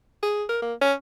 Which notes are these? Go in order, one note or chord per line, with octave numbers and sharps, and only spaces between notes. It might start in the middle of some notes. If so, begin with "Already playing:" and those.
G#4
A#4
A#3
C#4